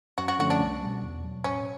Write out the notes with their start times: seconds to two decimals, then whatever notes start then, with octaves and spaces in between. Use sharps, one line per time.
0.18 F#2 F#4
0.28 F#4
0.39 D3 F3 A3 C#4 F#4
0.50 D4
0.60 C2
0.81 B2 G3
1.03 E2
1.24 B2 F#3
1.44 A2 C#4